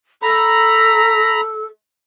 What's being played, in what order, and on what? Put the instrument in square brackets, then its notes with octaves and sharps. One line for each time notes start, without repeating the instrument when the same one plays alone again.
[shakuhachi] A4 [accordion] A#5 B5